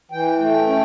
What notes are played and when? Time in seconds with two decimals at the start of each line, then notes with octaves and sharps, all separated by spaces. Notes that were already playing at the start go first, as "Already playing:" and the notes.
0.11 E3 G5
0.39 A3
0.67 C#4